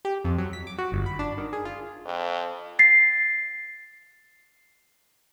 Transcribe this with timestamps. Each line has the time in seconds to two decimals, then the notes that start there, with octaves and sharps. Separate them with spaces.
0.05 G4
0.25 F2
0.38 F#3
0.53 B6
0.67 D6
0.78 F#4
0.92 G1
1.06 B5
1.19 D4
1.38 D#3
1.53 G#4
1.65 F4
2.05 F2
2.79 A6 C7